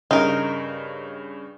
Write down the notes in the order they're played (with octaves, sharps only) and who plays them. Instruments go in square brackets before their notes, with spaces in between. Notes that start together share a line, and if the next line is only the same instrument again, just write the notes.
[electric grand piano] G2 C#3 [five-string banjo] D#4 A#4